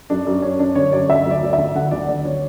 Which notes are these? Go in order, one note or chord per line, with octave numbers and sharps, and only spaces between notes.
F#2 D4
F#2
F#2 C#4
F#2 D4
D3 C#5
F#2 D5
D2 E5
D2 D5
D2
E5
D2
D3 F#5
D2 D5
D3 D5
D3 C#5